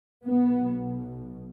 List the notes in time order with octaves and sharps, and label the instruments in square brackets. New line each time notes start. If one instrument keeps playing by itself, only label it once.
[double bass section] B1 B2 B3